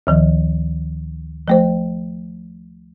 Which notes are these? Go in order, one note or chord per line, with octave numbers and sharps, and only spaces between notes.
D2 D#3 F3
F3 A3 C5